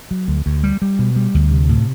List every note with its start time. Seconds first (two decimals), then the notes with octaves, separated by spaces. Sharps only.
0.11 F#3
0.28 D2
0.46 D2
0.64 G3
0.82 G3
0.99 B2
1.16 G3
1.34 D2
1.51 C3
1.69 A2